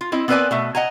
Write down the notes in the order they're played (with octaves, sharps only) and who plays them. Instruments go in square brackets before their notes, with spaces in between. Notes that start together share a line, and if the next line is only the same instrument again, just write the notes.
[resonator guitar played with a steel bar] F4
C4 E4 D#5
B3 C4 A#4 B4 D5 G#5
B2 A3 E5
D#5 F#5 G#5 A#5